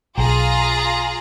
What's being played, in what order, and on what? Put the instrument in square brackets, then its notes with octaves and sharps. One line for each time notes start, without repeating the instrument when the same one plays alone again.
[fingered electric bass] B1 [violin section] F4 G#4 A#5